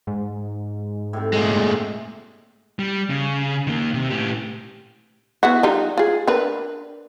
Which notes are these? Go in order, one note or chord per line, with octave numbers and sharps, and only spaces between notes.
G#2
A2 C3
A#2 G#3
G3
C#3
D#3 A#3
C3
A2 G4
B3 E4 F#4
G3 D#4 F4
F4 G#4
D4 A#4 B4